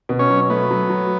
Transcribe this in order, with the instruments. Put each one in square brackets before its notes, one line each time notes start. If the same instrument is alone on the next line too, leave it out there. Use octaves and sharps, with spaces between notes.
[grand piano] B2
[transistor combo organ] C#4
[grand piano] F#3
[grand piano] A3 [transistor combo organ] B3
[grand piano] F#3
F#3